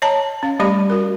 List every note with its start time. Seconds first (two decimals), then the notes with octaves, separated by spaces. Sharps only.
0.02 C#5 D#5 A5 A#5
0.43 C#4 F5
0.60 G3 A3 C#4 G4 D5 B5
0.90 F#4 A#4